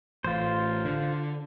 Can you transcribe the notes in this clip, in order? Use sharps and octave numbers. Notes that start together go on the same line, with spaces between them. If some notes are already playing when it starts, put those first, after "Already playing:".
A1 F4 C5
D3